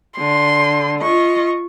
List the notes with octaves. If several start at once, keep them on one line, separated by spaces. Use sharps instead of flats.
D3 C6
F4 D#5 C#6